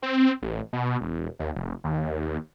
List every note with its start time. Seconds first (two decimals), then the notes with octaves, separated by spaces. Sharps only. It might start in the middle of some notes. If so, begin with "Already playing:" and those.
0.02 C4
0.42 A1
0.73 B2
1.01 E1
1.39 D#2
1.55 F1
1.84 D#2